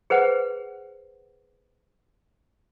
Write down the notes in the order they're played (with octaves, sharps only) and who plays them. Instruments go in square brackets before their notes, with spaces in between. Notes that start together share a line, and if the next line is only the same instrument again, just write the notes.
[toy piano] G#4 B4 C5 F#5